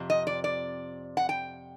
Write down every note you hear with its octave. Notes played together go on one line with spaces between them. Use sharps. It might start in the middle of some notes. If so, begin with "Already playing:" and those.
Already playing: F2 C3
D#5
D5
D5
F#5
G5